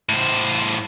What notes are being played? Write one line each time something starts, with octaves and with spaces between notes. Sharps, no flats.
A2 C5